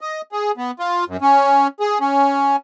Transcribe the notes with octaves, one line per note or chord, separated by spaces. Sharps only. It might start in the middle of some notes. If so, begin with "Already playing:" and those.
D#5
G#4
B3
F4
F#2
C#4
G#4
C#4